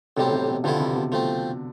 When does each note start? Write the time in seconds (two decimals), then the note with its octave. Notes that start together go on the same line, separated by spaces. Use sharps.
0.17 B1 A2 C3 G3 C4
0.33 C3
0.48 B2
0.64 G2 B2 D3 F3 B3 E4 A4
0.80 C3
0.96 B2
1.12 F3 A3 C4